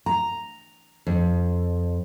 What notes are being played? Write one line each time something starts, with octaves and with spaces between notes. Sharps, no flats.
A#5
F2